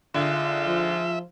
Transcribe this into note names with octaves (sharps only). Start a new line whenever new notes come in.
D3 G#3 D#4 F4 E5
F3